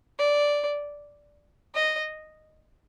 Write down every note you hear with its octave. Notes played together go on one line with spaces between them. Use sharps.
D5
D#5